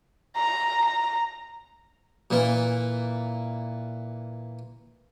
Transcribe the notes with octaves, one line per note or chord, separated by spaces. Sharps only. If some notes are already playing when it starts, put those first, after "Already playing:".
A#5
A#5
A#2 E3 A#3